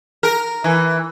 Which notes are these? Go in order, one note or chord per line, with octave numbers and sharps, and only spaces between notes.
A#4
E3